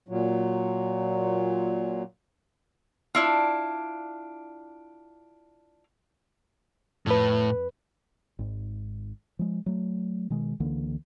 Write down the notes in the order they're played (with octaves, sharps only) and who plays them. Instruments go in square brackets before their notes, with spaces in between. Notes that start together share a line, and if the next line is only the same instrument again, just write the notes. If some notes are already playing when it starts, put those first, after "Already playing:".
[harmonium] A#2 F#3
[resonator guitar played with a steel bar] D4 E4 F4
[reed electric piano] F2 B4 [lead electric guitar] A2
[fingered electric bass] G#1 G#2
F3 G#3
F#3 A3
B2 D#3 G#3
C#2 D3 E3 A#3